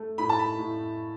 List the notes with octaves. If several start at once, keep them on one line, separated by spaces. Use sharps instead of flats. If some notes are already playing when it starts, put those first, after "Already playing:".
Already playing: A3
A2 B5
A5
B5
A2